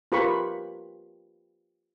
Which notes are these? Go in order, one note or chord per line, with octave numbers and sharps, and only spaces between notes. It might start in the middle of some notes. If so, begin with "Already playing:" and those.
F4 G4 A#4 B4 B5 C#6